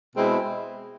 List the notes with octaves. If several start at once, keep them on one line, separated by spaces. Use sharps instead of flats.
B2 G#3 C4 E4